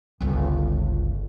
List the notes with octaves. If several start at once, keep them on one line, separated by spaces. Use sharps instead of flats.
G1 C#2